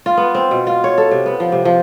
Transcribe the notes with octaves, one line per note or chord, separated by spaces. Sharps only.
F4
B3
C4
B2
F4
C#5
A4
C3
B3
F3
C3
F3